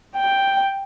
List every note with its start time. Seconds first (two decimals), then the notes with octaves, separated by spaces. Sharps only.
0.16 G5